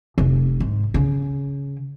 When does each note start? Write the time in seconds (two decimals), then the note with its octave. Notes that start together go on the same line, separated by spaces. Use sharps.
0.18 F1
0.60 G#2
0.94 C#3